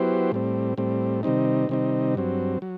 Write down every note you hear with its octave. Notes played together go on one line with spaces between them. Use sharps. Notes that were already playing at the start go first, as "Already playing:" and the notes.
Already playing: F#3 B3 E4 G4 C5
A2 G3 C4
A2 G3 C4
C3 D#3 G3 C4 D#4
C3 D#3 G3 C4 D#4
G2 F#3 C4
F#3